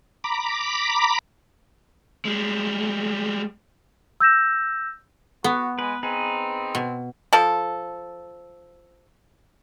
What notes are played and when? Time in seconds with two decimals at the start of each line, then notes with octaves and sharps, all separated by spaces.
0.24 A#5 B5 D6
2.25 G3 G#3
4.20 E6 G6 A#6 E7
5.44 B3 F#4
5.79 G#3 B4
6.03 C4 D#4 G#4 B4
6.75 B2
7.33 F3 A4